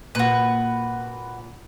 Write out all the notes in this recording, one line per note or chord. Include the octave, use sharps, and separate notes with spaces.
A#2 F#4 B4